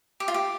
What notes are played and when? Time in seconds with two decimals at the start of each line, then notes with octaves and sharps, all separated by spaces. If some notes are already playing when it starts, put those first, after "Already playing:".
0.20 G4
0.28 F4
0.34 G4